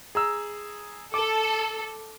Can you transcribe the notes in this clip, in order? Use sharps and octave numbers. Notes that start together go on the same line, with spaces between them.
G#4 A#5 E6
A4 D6